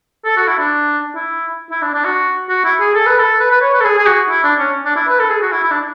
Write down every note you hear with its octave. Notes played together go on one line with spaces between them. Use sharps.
A4
F#4
E4
D4
E4
E4
D4
D4
F#4
F#4
E4
G#4
A4
B4
A4
B4
B4
C#5
B4
A4
G#4
G#4
F#4
E4
D4
C#4
D4
E4
B4
A4
G#4
F#4
E4
E4
D4